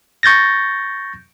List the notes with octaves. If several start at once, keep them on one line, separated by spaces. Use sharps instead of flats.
C#6 G6 A6 A#6